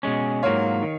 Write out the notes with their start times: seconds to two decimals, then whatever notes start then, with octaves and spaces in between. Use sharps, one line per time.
0.03 B2 G#3 C#4
0.43 G#2 F#3 A#3 F4 C#5 F5
0.83 D#3